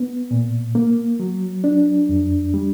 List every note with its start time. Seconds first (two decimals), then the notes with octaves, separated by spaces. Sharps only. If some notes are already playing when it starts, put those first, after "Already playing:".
Already playing: B3
0.31 A#2
0.75 A#3
1.20 F#3
1.64 D4
2.09 F2
2.54 G3